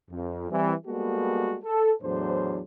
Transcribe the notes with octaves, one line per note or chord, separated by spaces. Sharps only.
F2
E3 G3 C4
G3 G#3 A#3 B3 F#4 A4
A4
E2 A2 F#3 D4 C5